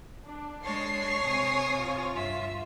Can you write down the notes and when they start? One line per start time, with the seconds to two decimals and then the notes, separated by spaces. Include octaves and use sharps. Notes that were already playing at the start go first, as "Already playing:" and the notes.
0.25 D4
0.64 G#3 D4 C#5 A5 C7
1.24 C3 G#5 D#6
1.81 F4
2.13 G2 E5